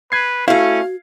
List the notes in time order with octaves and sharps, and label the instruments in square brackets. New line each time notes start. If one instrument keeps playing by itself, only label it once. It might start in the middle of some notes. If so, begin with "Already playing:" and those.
[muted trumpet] B4 [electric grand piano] G#6 C7
[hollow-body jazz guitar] A3 E4 [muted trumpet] C#4 [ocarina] F#4 [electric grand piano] F5